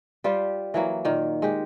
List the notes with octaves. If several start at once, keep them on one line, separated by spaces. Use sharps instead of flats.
G3 F4 G4 C5
E3 F#3 A#3
A#2 D#3
G#3 G4